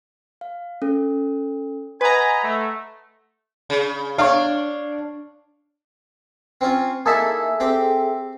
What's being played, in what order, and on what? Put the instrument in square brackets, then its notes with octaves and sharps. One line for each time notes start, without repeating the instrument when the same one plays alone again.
[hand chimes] F5
C#4 A4
[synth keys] B4 A#5 [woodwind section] D#5 G#5 [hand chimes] F#5 C6
[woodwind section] A3
[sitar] C#3
[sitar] D4 [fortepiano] C#5 F5
[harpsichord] C4 C#4 F4
[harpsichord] A#3 D#4 E4 [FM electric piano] G#4 A4 E5
[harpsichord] C4 G4 G5